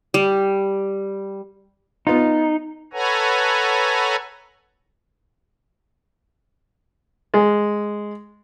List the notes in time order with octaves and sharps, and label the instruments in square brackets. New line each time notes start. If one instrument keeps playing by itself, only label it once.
[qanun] G3
[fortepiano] B3 F4 [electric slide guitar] D#4
[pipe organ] A4 B4 C#5 F#5 G#5 A#5
[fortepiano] G#3